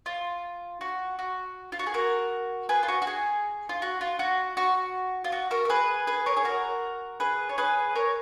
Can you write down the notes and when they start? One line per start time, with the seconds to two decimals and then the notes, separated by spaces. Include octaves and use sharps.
0.06 F4
0.81 F#4
1.19 F#4
1.72 F4
1.79 F#4
1.86 G#4
1.94 F#4 A#4
2.69 G#4 B4
2.83 F4
2.88 F#4
3.02 F#4
3.07 G#4
3.69 F4
3.82 F#4
4.01 F4
4.19 F#4
4.57 F#4
5.24 F4
5.32 F#4
5.51 F#4 A#4
5.65 A#4
5.70 G#4 B4
6.07 G#4 B4
6.26 A#4 C#5
6.37 G#4
6.45 F#4 A#4
7.20 G#4 B4
7.49 C#5
7.58 G#4 B4
7.95 A#4 C#5